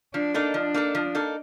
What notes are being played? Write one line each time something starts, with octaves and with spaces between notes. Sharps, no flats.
F3 D4
A#3 D#4 A4
F3 D4
A#3 D#4 A4
F3
A#3 D#4 A4